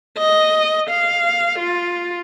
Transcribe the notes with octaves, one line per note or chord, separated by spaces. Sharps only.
D#5
F5
F4